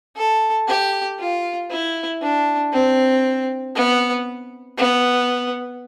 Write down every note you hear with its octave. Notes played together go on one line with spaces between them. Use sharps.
A4
G4
F4
E4
D4
C4
B3
B3